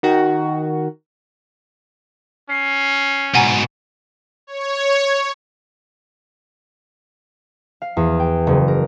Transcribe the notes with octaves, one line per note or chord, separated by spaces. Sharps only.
D#3 F#4
C#4 C7
G#2 B2 F#5 G#5 A#5
C#5
F5
E2
G5
F#1
A#4